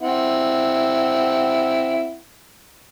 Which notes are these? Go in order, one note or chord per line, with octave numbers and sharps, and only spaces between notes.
C4 E4 F#5